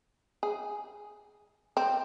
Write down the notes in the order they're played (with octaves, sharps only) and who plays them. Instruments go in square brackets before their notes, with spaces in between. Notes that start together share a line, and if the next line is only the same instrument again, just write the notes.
[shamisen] G#4
C4